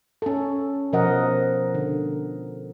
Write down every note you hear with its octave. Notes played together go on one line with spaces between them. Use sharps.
C#4 A4
B2 F3 A#4 D#5 F#5
D3